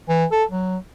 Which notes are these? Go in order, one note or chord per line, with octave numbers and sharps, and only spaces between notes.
E3
A4
F#3